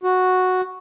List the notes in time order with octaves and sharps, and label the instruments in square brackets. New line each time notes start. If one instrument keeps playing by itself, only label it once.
[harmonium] F#4